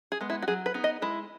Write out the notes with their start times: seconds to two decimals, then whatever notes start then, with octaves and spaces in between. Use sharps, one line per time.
0.12 G#4
0.21 G#3 B3
0.30 E4
0.42 F#4
0.48 F#3 G#4
0.66 B4
0.74 B3 D#4
0.84 D#5
1.02 G#3 E4